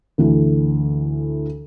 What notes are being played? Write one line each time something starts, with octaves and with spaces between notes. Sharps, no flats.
D2 E3 A3